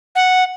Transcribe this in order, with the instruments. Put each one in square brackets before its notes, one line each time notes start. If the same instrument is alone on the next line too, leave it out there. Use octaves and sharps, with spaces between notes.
[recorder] F#5